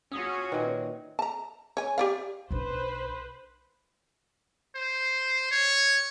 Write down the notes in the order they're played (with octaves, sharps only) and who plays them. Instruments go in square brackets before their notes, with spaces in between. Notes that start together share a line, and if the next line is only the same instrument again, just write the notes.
[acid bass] C#4 [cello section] F4 F#4 G#4 [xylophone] D#6 E6
[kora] A#2 D#3 [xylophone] B4 C#5 E5
[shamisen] A5 A#5
C#5 G#5
G4 D5 F5
[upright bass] B1 D4 [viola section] B4 C5
[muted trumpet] C5
C#5